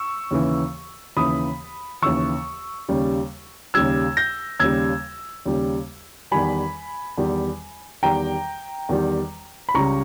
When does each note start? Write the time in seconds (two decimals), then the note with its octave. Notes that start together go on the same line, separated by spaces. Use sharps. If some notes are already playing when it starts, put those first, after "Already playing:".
Already playing: C#6 E6
0.31 D#2 C#3 E3
1.17 D#2 C#3 E3 B5 D#6
2.02 D#2 C#3 E3 C#6 E6
2.88 D#2 C#3 G3
3.74 D#2 C#3 G3 E6 G#6
4.17 G6 A#6
4.60 D#2 C#3 G3 E6 G#6
5.46 D#2 C#3 G3
6.31 E2 D#3 G3 G#5 B5
7.18 E2 D#3 G3
8.03 E2 D#3 G3 G5 A#5
8.89 E2 D#3 G3
9.69 B5
9.74 C#2 C#3 G3 A#5 C#6